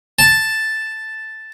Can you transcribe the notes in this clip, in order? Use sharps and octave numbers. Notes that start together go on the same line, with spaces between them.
A5